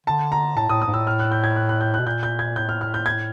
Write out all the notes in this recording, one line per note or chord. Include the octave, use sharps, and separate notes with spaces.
D3 A5
A#5
A2 A5
A2 D#6
D#6
G#2
A2 E6
F6
F#6
G6
G#6
F#6
F#6
G6
F#6
B2
A#2 G6
G6
G#6
A2 G6
F6
F6
G6
G#6